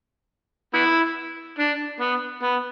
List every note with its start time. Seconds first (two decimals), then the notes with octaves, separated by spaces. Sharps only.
0.74 B3 E4
1.59 D4
2.00 B3
2.43 B3